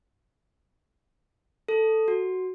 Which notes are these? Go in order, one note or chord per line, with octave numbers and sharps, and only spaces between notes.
A4
F#4